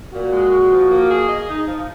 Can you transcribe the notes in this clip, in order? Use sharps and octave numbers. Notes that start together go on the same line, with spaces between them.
A#2 F#4
G#3
A#2
F3
A#3
G#4
D#5
D#4
F3